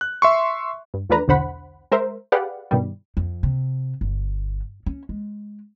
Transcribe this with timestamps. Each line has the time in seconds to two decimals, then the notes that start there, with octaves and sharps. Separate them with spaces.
0.01 F#6
0.22 E5 C6 C#6
0.94 G2
1.09 E2 F3 A3 D4 B4 A#5
1.28 B1 E2 D3 C5 F#5 B5
1.91 G#3 A#4 C5 E5
2.32 G4 G#4 B4 D5 F5 F#5
2.71 G2 B2 D#3 G3
3.17 F2
3.43 C3
4.01 G1
4.86 C#4
5.09 G#3